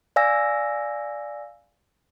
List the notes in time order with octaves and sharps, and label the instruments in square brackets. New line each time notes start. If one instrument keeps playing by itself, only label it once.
[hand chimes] D5 F5 G#5 E6 A#6